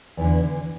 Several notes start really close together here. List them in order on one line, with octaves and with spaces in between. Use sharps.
E2 E3 D3